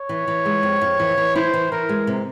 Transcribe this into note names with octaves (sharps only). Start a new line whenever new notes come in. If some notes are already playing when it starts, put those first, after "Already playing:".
Already playing: C#5
E3
E3
G#3
F2
F2
E3
E3
E4 C5
E3
E3 A#4
G#3
C3